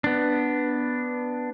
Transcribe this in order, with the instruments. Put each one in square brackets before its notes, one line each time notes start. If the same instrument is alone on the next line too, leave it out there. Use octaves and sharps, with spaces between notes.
[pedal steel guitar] B3 D4